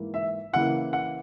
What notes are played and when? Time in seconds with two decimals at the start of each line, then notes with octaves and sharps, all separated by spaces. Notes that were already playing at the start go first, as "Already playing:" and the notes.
Already playing: G#2 E3 A#3
0.14 E5
0.53 C#3 E3 A#3 E4 F#5
0.93 F#5